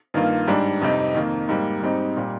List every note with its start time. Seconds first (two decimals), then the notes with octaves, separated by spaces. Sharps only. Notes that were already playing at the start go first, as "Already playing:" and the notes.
0.14 G2 D#3 A#3 F4
0.47 G#2 G3 D4
0.81 F2 C3 G3 C4 D#4
1.14 F2 D#3 A#3
1.49 G#2 G3 A#3
1.83 G#2 G3 C4 D#4
2.17 A#2 G3